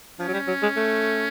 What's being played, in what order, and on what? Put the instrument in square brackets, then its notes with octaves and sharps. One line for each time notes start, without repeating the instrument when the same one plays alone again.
[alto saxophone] F3 [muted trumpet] C#4
[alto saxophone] F#3
G3
F#3
G#3
A3